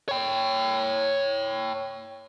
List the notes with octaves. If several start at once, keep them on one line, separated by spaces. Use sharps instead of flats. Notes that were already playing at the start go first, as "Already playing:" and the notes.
C#5 G5